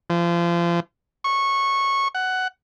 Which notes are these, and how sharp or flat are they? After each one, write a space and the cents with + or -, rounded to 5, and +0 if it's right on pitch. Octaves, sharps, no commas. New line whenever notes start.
F3 -30
C#6 -15
F#5 +10